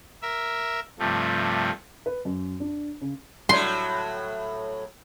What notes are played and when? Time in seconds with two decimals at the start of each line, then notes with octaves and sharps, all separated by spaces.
0.22 A#4 E5
0.99 G2 C3 F3 A3
2.06 B4
2.25 F#2
2.60 D4
3.01 C#3
3.49 A2 F#3 C6